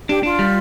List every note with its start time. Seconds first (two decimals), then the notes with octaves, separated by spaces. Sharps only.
0.09 D4 G4
0.23 D4 F4
0.39 G3